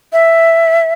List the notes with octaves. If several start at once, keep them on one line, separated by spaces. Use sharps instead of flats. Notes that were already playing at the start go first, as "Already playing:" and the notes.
E5